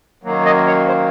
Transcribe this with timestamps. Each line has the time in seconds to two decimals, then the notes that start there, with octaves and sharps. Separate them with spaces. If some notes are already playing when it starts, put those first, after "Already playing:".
0.23 F#2 D#3 F#3 A#3
0.45 D#5
0.67 C#5
0.88 C5